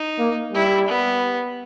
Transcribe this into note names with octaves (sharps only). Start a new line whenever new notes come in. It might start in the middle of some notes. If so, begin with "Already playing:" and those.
Already playing: D#4
A#3
G3 E4
B3